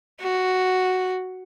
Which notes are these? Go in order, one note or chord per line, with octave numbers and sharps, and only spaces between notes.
F#4